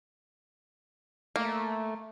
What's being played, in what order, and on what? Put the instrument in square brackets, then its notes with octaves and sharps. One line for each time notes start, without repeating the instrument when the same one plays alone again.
[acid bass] A3 [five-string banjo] A#3